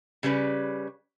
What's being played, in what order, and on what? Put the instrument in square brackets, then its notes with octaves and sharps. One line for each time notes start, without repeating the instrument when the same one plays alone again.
[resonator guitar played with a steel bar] C#3 G3 C#4 B4